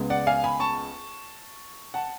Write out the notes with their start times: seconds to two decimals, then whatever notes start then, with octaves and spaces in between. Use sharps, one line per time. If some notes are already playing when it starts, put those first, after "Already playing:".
Already playing: C#2 C#3 G#3 B3
0.10 D5 F#5
0.27 F5 G#5
0.44 G#5 B5
0.60 A5 C#6
1.94 F#5 A5